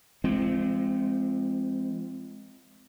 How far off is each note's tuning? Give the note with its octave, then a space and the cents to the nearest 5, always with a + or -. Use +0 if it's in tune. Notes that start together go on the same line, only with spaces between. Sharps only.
F3 -35 G#3 +0 C4 +0